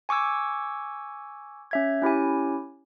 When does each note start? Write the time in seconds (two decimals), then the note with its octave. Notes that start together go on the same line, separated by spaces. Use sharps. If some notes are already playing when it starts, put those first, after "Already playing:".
0.09 G#5 C#6 D6 E6 G#6
1.71 C#4 E5 G#6
2.02 C#4 E4 G4 G#5